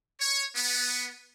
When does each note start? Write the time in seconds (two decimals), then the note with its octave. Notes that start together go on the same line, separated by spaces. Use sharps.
0.20 C#5
0.55 B3